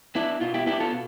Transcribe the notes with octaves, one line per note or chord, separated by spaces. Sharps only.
B3 D4 E4
B2 F4
E4 G4
B3 D4 E4 G4
F4 A4
B2